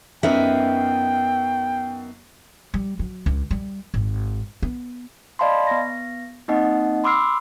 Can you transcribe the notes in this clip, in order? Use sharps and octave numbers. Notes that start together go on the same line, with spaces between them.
F#2 B3 D#4 A#4 E5 G5
G3
F#3
C#2
G3
G#1
B3
D5 D#5 F5 A5 B5 C6
B3 A#6
A#3 C4 D#4 D#5 F#5
B5 C6 D6 E6 F6 C7